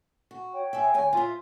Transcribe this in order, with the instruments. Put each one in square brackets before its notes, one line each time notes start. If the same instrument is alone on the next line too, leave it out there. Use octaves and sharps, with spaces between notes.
[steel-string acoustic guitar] F#4
[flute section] C#5 G5
[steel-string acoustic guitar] G#4 E5
D2 G#5
[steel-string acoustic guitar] F4 C5 [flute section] E5 C6